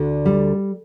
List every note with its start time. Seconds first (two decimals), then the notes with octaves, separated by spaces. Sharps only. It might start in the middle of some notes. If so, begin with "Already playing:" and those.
Already playing: D2 D3
0.25 G3